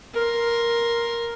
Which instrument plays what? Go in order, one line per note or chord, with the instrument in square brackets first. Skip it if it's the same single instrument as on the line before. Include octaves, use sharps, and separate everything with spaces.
[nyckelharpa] A#4 C6